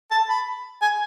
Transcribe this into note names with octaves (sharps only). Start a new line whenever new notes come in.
A5
B5
G#5